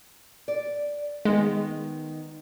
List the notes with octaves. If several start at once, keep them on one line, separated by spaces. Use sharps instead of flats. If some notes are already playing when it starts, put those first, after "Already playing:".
D5
D#3 G#3 B3